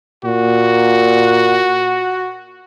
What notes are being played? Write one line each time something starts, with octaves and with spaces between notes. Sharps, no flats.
A#2 F#4